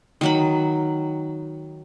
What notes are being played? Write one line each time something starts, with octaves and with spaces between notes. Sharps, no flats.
D#3 F#3 B5